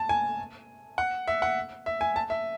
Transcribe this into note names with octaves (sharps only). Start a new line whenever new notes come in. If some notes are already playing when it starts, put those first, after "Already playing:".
Already playing: A5
G#5
F#5
E5
F#5
E5
G#5
A5
E5